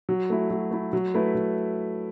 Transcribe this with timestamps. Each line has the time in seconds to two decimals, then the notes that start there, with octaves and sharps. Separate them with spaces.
0.09 F#3
0.30 A3 E4
0.50 F#3
0.71 A3 E4
0.93 F#3
1.14 A3 E4 B4
1.35 F#3